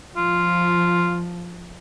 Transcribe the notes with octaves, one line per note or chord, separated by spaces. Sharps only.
F3 F4